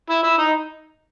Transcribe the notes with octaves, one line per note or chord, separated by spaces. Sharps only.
E4 E5
E4 E5
D#4 D#5